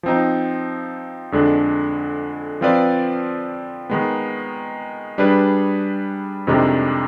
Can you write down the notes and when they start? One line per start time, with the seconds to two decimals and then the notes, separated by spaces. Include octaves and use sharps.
0.03 F3 C4 D#4
1.32 F2 D3 G#3 D4
2.61 F3 C4 F4 B4 D5
3.90 D#3 G#3 B3
5.18 G3 D4 G#4 B4
6.47 F2 C3 D#3 G#3 D4